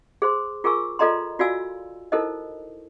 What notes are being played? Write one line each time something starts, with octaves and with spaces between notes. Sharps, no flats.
G#4 C5 C6
F4 G#4 A#4 G#5 C#6 E6
F4 A4 D5 D#5 A#5 C6
F4 F#4 D5 F5 G#5 E6
D#4 E4 A4 A#4 C5 D#5